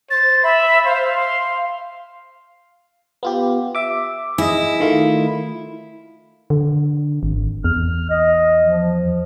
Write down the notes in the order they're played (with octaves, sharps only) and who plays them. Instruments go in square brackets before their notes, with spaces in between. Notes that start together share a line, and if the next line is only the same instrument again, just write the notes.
[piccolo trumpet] C5 [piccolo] A6
[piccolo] E5 [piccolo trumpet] B5
[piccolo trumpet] C5 [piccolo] F5
[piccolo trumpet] C6
[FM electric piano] B3 F4 G4
E5 D6
[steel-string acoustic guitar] E4 [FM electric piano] G#4 D#5
[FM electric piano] D#3 A3 F4
[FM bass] D3
G#1
[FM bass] E2 [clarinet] F6
[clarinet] D#5
F3